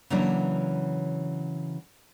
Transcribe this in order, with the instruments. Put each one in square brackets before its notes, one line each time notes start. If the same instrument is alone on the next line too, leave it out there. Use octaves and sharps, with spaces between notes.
[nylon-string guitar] C#3 E3 F#3 A#3 C#4 D4